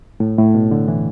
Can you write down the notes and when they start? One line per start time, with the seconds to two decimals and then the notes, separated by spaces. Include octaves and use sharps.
0.20 A2
0.38 A2
0.54 B2
0.71 D3
0.88 E3